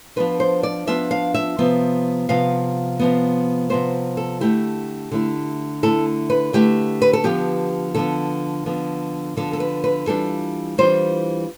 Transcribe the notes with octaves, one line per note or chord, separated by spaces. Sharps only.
F3 B3 D4 F4 B4
C5
D5
F3 B3 D4 F4 E5
F5
E5
C3 F3 B3
C3 F3 B3 F5
C3 F3 B3
C3 F3 B3 C5
A4
D3 A3 E4 G4
D3 A3 E4
D3 A3 E4 A4
B4
D3 A3 E4 G4
B4
A4
D3 F3 B3 G4
D3 F3 B3 A4
D3 F3 B3
D3 F3 B3 A4
A4
B4
B4
E3 G3 D4 F4 A4
E3 G3 D4 F4 C5